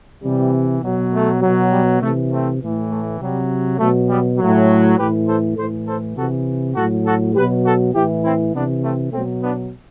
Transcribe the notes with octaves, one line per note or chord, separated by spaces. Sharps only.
C3 E3 G3
B2 F#3
A3
B2 F#3
G3
C3 E3 A3
A3 C4
A2 E3
A3
C3 F#3 G3
B2 F#3 A3
G3 B3
A2 F#3
A2 E3 G4 B4
A4 C5
A2 E3 A4 C5
A4 C5
C3 E3 F#4 A4
A2 F#3 F#4 A4
F#4 A4
B2 F#3 G4 B4
F#4 A4
A2 E3 E4 G4
C4 E4
C3 E3 B3 D4
A3 C4
B2 A3 C4
F#3
B3 D4